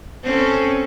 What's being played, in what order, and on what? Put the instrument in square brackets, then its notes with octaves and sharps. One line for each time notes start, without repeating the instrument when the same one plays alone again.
[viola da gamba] C4 C#4 A4